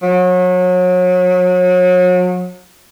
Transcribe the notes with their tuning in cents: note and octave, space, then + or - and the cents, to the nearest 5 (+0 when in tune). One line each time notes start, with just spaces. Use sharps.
F#3 -35